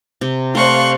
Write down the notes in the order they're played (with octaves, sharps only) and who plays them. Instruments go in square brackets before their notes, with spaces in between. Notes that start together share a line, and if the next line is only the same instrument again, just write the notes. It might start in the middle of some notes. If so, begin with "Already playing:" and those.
[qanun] C3
[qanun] A3 G4 [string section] C5 D5 F5 [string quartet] C6 C#6 F#6